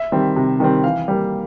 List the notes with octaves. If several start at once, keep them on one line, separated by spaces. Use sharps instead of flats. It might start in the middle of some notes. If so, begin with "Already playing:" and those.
Already playing: E5
D#3 G3 C4
C3
D#3 G3 C4
E3 F5
G3 A#3